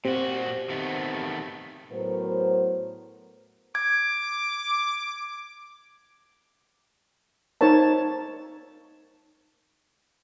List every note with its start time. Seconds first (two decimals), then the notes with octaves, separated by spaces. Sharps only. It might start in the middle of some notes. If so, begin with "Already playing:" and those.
0.05 A#2 C4 F#4 G4 C5
0.70 D#3 A3 B3
1.92 A2 F#3 B3 A#4 C5
3.75 D6 G#6
7.61 D#4 A#4 C5 C#5 A5